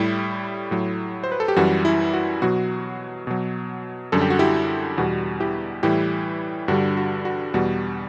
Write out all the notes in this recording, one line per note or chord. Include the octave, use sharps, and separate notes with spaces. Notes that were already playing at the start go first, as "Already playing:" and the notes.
Already playing: A2 G3 E4 G4
A2 F#3
C5
B4
A4
G4
F#2 E3 G3 F#4
E4
F#4
B2 F#3 F#4
B2 F#3
F#2 D3 G3 A4
G4
F#4
E4 G4
E2 B2 G3 F#4
E4 G4
A2 E3 G3 E4 G4
G2 D3 G3 F#4
F#4
F#4
E2 B2 G3 F#4